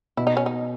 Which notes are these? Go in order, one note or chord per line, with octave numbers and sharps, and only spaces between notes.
B2 E4
D#4
C#4
D#4